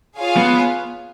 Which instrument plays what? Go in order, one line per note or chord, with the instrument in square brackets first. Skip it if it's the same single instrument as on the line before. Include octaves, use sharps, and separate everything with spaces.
[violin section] F4 G#4 C#5 F5 G#5
[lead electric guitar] B3